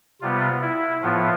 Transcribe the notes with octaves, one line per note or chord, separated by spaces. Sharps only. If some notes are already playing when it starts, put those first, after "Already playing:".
C3 G3 B3 F4
E4
A2 F3 B3 F4